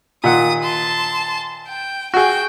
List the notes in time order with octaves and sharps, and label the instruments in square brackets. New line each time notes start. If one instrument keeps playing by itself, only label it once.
[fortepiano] A#2 D#3 F#5 [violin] D#6
[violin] A5 C6
G5
[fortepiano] F#4 G#4 [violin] G5